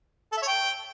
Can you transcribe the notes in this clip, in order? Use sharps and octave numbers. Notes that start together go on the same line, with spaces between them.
A4
E5
C#5
G5